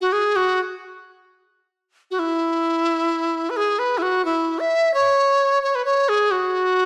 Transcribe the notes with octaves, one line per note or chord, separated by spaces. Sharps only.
F#4
G#4
F#4
F#4
E4
B4
G#4
B4
E4
F#4
E4
E5
C#5
C#5
B4
C#5
G#4
F#4